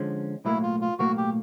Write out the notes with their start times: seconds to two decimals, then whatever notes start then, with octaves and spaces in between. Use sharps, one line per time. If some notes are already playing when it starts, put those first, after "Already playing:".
Already playing: D3 F3 G#3 C#4
0.45 B1 A2 F#3 A#3 E4
0.63 F4
0.81 F4
0.99 B1 A2 F#3 A#3 F#4
1.17 G4